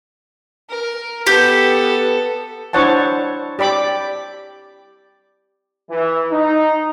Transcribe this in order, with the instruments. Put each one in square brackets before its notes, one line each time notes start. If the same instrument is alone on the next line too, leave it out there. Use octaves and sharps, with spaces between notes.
[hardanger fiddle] A#4
[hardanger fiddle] B3 A4 [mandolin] G4
[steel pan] D4 E4 C5 C#5 F#5 A5
G4 D5 B5 D6
[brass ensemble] E3
D#4